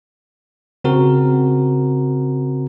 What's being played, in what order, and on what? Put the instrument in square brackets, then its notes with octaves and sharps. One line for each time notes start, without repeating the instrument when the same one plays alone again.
[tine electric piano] C#3 C4 F#4 A#4